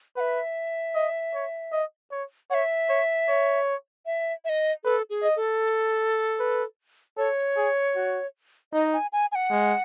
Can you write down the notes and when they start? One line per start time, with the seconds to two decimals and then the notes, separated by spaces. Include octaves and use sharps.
0.16 B4 F#5
0.20 E5
0.95 D#5
1.34 C#5
1.72 D#5
2.11 C#5
2.50 C#5 E5 F#5
2.89 C#5
3.28 C#5
4.06 E5
4.45 E5
4.49 D#5
4.84 A4 B4
5.10 G#4
5.23 D#5
5.36 A4
6.39 B4
7.17 A4 C#5
7.57 G#4
7.96 F#4
8.73 D#4 D#5
8.93 G#5
9.12 G#5
9.32 G#5
9.35 F#5
9.51 G#3